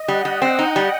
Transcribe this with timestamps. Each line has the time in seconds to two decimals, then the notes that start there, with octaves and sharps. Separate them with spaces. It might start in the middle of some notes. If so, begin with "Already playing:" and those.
Already playing: D#5
0.08 G3 F#5
0.25 G3
0.41 C4 G5
0.59 D#4
0.76 G3